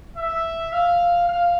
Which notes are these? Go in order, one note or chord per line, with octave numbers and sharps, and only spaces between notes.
E5
F5
F5